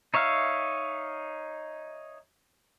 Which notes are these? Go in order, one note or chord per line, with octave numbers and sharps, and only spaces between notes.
D#4 C#5 E5 F5